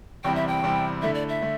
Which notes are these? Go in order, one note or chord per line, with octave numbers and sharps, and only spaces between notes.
E2 C3 G3 C4 E4 G5
E5
G5
E2 C3 G3 C4 E4
D3 A3 E4 E5
D5
E5
D3 A3